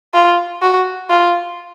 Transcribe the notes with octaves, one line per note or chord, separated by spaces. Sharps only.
F4
F#4
F4